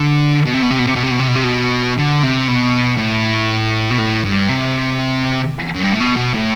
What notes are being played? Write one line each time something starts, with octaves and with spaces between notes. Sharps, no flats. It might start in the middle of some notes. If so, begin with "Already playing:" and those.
Already playing: D3
B2
C3
B2
C3
B2
C3
B2
C3
B2
C3
B2
C3
B2
D3
C3
B2
A2
B2
A2
G2
C3
F#2
G2
A2
B2
B2
A2